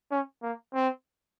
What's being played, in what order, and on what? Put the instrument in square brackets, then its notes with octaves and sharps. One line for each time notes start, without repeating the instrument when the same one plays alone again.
[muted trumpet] C#4
A#3
C4